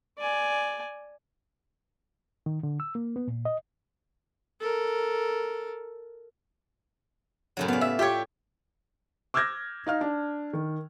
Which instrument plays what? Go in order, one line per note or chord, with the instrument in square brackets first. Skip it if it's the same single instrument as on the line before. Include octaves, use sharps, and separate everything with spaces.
[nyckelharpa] D5 G#5
[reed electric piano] D#3
D3
E6
A#3
B3
A#2
D#5
[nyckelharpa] A4 A#4
[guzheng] F#2 A2 F#3 [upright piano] C#3 G3
[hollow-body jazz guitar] B3 [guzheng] D5 F5
[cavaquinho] E5
[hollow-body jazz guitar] F4 [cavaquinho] G4 C#5 [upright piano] E5 G5
[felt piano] D6 E6 F6 G6 G#6 A#6
D#4 F5 F6
D4
D#3